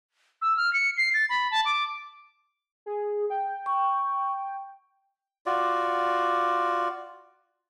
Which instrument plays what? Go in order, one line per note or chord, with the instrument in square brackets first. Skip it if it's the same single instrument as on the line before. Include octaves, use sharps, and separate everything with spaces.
[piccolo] E6
F6
C#7
C7
A6
B5
A5
D6
[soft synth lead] G#4
G5
[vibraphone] C#6
[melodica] F4 F#4 D5